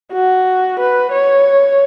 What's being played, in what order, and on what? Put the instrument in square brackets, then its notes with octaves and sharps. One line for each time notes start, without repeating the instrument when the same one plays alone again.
[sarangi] F#4
B4
C#5